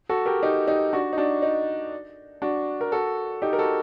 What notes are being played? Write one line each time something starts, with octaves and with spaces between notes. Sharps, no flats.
F#4 A4
G4 A#4
D#4 G4
D#4 G4
D4 F#4
D#4
D4 F#4
D#4
D4 F#4
A#4
F#4 A4
D#4 G4
A#4
F#4 A4